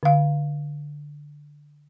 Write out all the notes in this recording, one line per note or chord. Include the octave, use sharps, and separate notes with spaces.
D3 F5